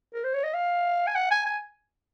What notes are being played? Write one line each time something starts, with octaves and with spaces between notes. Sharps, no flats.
A#4
C5
C#5
D#5
F5
G#5
F#5
G#5
G#5